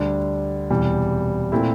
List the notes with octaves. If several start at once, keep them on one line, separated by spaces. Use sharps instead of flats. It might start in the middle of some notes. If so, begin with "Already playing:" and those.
Already playing: D2 D3 G3 D4
E1 E2 C3 E3 G3
A#2 A3 C4 E4